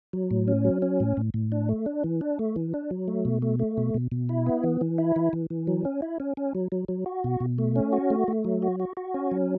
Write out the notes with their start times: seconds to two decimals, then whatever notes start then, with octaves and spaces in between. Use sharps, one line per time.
0.13 F#3
0.31 A2
0.48 C#4
0.65 F#3
0.82 C#4
1.00 A2
1.17 A2
1.34 A2
1.52 D4
1.69 A3
1.86 D4
2.04 E3
2.21 D4
2.39 A3
2.56 E3
2.74 D4
2.91 F#3
3.08 A3
3.25 B2
3.42 A3
3.59 A3
3.77 B2
3.94 B2
4.12 B2
4.29 E4
4.46 B3
4.63 E3
4.81 E3
4.98 E4
5.16 E3
5.33 E3
5.50 E3
5.67 F#3
5.85 C#4
6.02 E4
6.20 C#4
6.37 C#4
6.55 F#3
6.72 F#3
6.88 F#3
7.06 F#4
7.24 B2
7.40 B2
7.58 A3
7.76 C#4
7.93 F#4
8.10 A3
8.28 A3
8.44 F#3
8.62 F#4
8.80 F#4
8.97 F#4
9.14 C#4
9.31 F#3